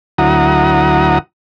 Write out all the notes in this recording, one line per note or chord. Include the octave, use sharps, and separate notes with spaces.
D2 F#3 E4 F#5 A#5 D#6